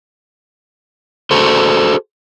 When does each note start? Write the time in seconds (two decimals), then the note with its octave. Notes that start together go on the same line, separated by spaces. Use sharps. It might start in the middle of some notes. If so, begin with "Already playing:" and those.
1.31 F#4 G#4 A4 C5